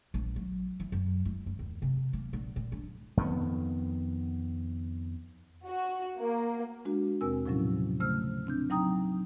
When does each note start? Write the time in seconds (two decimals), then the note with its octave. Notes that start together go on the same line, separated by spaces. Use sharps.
0.14 A#1
0.36 F#3
0.80 E3
0.92 F#2
1.25 E4
1.46 F#2
1.59 D#2
1.82 C3
2.13 A#3
2.33 A#1
2.56 A#2
2.72 D4
3.17 F2 D#3 B3
5.66 F#4
6.18 A#3
6.85 G#3 D4 F#4
7.21 D#2 B2 C4 A#4 G#5 E6
7.46 A2 C3 F3 F#3 C#4 E4
8.00 C#3 A3 C5 E6 F6
8.47 C4 D4 G6
8.70 F#3 C4 D#4 G5 A#5 D#6